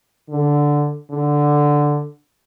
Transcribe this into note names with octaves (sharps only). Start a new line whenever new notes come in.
D3
D3